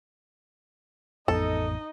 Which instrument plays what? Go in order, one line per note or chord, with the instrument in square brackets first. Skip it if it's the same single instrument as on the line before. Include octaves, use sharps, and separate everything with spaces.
[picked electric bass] A1 F2 B3 [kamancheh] D#4 D#5 [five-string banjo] A4